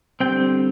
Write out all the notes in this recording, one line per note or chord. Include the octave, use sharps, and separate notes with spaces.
D3 G3 C4 G5